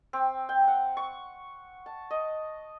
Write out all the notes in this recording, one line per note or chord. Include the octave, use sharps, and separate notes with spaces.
C4
G5
F#5
C#6
A5
D#5